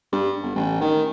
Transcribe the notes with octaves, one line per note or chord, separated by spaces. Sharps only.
G2
G1
A1
D#3